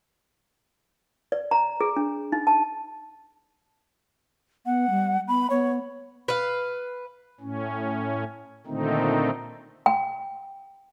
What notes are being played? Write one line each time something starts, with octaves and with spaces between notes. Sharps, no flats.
D5
A#5
G#4
D4
D#4
A5
B3 F#5
G3
B3 B5
B3 C#5
B4 F5
A2 C#4
A#2 D3 D#3 A3 C4 D#4
G5